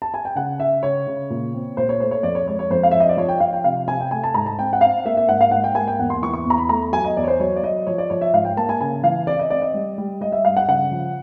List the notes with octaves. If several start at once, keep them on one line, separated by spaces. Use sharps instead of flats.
A5
G#5
G5
C#3 F#5
C#3 E5
C#3 C#5
C#3
A#2
C4
A#2 C5
C#5
A3 C5
C#5
F2 D5
C#5
G#3 C#5
C#5
F2 C5
F5
F3 E5
D#5
D5
F3 C#5
G5
F3 F5
G5
C3 F5
C3 G#5
G5
A3 G#5
A5
G#2 A#5
A5
C4 G5
F#5
C4 F5
A#3 E5
E5
G#2 F#5
F5
G#2 F#5
G5
A#3 G#5
G5
E2 F#5
C6
E3 C#6
C#6
E2
A#5
B5
A3 A#5
F#3 G#5
D#5
E2 D5
C#5
C5
F#3 C#5
D5
F#3 D#5
F3 C#5
D5
F3 C#5
E5
G#2 F5
G5
A#3 A5
G#5
C#3 G#5
E3 F5
C4 D5
D#5
C4 D5
D#5
G3
G3
G3 D#5
E5
G2 F5
F#5
C#3 F#5
F3